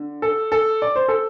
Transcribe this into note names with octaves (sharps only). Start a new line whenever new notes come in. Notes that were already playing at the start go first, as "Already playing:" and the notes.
Already playing: D3
A4
A4
D5
C5
A4